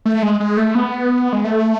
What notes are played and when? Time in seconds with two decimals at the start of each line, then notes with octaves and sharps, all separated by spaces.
0.06 A3
0.23 G#3
0.40 G#3
0.57 A3
0.75 B3
1.33 G#3
1.44 A3